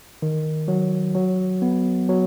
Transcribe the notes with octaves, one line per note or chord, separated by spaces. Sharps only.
D#3
F#3
F#3
B3
F#3